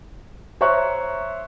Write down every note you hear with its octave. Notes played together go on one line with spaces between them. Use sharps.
C5 C#5 E5 A#5 C#6 F#6